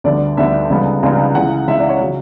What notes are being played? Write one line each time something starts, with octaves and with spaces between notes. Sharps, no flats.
D2 D3 G3 B3 D5
D2 D3 G3 B3 E5
C#2 C#3 G3 B3
C#2 C#3 G3 B3
C#2 C#3 E3 F#5
C#2 C#3 E3 E5
D5
C#5
C#3 F#3